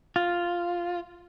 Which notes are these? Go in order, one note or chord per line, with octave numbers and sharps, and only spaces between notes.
F4